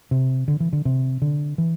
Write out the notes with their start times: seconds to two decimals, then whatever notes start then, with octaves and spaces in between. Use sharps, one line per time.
0.11 C3
0.48 D3
0.60 E3
0.73 D3
0.85 C3
1.22 D3
1.58 E3